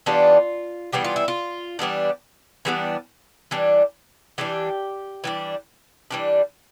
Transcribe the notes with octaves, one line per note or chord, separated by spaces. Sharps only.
E3 G3 B3 D4 F4
E3 G3 B3 D4 G4
F4
E4
F4
E3 G3 B3 D4
E3 G3 B3 D4
E3 G3 D4
E3 G3 D4 G4
E3 G3 D4
E3 G3 D4